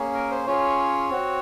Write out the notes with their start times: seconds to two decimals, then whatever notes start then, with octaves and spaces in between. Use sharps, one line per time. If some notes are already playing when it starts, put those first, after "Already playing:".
Already playing: A#3 C#4 G#4
0.14 A#4
0.31 C5
0.47 C#4 F4 G#4 C#5
1.09 C4 F#4